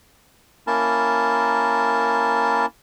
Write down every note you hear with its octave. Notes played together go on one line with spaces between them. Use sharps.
A#3 C#4 E4 A#4 A5